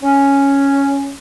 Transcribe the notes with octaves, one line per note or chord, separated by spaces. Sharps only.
C#4